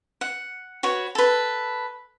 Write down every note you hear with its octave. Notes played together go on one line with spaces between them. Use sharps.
F#5
F#4 B4 C#5
A4 B4